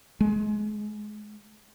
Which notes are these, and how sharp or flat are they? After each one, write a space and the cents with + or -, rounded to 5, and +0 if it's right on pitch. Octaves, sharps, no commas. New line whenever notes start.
G#3 +25